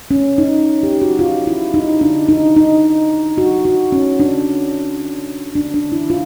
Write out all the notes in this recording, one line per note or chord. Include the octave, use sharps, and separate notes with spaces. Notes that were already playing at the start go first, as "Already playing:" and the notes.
C#4
D#4
G4
F#4
F4
E4
D#4
D4
D#4
D#4
F#4
F#4
C#4
D4
D4
D4
E4
F4